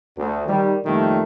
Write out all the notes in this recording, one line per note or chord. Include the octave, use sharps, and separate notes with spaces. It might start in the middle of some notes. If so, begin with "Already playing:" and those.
D2
D#3 G3
F2 A#2 D#3 G3 A3